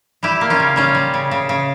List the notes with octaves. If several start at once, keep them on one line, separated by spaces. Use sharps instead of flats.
G3 E4 G4
A#3
C#4 F4
C#3
G3 C#4 F4
G3
C#3
C#3
C#3